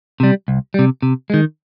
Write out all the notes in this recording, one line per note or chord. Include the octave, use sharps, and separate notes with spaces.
C3 G3
C2
C3 G3
C3
D#3 G#3